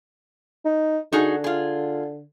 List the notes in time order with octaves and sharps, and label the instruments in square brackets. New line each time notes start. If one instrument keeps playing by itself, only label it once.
[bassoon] D#4
[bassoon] D3 [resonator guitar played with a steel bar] D#4 F#4 G#4
[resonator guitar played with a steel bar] F4 G#4